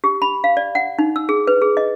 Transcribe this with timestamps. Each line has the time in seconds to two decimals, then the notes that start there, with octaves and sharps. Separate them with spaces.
0.04 G4
0.22 B5
0.44 F5
0.57 D5
0.75 F#5
0.99 D#4
1.16 E6
1.29 G#4
1.47 B4
1.62 G#4
1.77 D#5